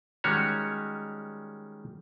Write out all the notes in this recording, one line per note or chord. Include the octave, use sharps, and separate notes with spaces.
D#3 G3 G#3 C#4 F#4 C#5